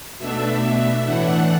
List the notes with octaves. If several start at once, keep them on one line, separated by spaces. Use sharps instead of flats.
B2 A3 D4 E5
A2 E3 A3 D4 F#5